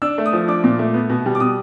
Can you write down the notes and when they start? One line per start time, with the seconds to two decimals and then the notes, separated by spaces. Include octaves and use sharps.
0.02 D4 E6
0.18 A3
0.26 D#6
0.33 F3
0.48 D4 D6
0.64 A#2
0.79 A3
0.94 B3
1.10 B2
1.26 G3
1.35 D6
1.40 B2 D#6